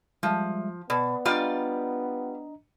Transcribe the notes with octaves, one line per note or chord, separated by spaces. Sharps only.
F3 G3 G#3 E5
B2 B3 D5
G3 D4 F4 D5 D#5 A#5